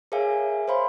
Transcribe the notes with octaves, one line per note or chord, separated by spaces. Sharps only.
G#4 A#4 C#5 E5 F5 G#5
C5 C#5 F5 B5 C6